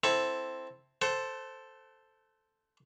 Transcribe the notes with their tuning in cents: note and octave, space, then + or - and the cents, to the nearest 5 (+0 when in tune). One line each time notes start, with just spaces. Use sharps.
C4 +0 E4 +0 A4 +0
A4 +0 C5 +0 F#5 +45